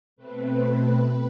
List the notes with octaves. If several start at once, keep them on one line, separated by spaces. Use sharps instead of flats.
B2 A3 C4 B4